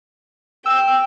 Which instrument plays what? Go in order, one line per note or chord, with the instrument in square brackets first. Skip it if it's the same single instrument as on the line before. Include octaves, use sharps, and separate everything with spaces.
[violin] G5 [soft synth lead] E6